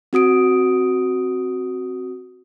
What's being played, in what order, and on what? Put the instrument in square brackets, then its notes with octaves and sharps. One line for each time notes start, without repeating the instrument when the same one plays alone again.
[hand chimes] C4 F#4 D#6 D7